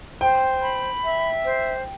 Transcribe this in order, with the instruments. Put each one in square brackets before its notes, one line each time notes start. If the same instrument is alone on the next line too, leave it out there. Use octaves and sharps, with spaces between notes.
[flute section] C5 [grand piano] G5
[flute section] B5
E5
C5